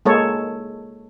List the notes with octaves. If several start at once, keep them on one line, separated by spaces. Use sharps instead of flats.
G#3 A#3 A4 C#5